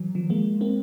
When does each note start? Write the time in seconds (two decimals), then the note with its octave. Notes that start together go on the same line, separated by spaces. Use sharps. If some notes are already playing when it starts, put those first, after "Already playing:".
Already playing: E3 F#3
0.15 D#3 F3
0.30 G#3 A#3
0.61 A#3 C4